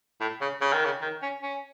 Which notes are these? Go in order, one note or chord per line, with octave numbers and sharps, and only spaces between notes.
A2
C#3
C#3
D#3
C#3
D#3
C#4
C#4